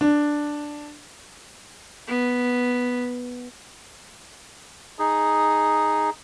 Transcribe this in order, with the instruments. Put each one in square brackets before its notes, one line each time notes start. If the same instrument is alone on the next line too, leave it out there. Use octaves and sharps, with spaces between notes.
[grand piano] D4
[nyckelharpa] B3
[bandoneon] D#4 G#4